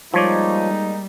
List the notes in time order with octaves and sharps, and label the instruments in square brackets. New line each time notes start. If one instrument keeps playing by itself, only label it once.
[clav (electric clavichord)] F3 C#5 D5 [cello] G3 [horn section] G#3 A#3 D#4